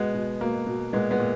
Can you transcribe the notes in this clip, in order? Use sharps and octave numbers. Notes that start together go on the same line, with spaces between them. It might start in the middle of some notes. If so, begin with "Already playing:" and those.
Already playing: B2 G#3 B3
B2
B2 A#3
B2
A#2 G#3 B3
G#3 B3
A#2